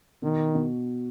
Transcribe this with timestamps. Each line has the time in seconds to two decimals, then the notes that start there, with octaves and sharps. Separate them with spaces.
0.22 B2 D#3
0.55 B2